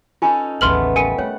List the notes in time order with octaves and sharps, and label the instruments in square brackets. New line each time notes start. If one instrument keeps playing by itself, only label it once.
[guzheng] C#4 D#4 A4 [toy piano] F4 G#5
[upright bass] A1 D#2 [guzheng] C#3 A3 B3 [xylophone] C6 F6 F#7
[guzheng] G3 [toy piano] A#4 [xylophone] G#5 C#7 D#7
[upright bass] A3 [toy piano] C#5 [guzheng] F#5